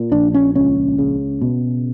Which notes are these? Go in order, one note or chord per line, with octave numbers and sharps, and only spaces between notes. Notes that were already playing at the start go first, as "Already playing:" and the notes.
Already playing: A#2
A#1 D4
C#4
C#2 C#4
C#3
B2